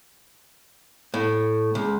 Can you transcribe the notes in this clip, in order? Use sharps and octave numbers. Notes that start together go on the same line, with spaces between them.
A2
C#2